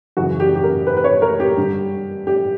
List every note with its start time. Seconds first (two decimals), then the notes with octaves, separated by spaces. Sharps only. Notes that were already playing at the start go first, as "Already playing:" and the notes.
0.17 F#2 C#3 E3 F#4
0.40 G4
0.55 G4
0.64 A#4
0.87 B4
0.97 B4
1.04 C#5
1.22 A#4
1.40 G4
1.57 G2 D3
2.27 G4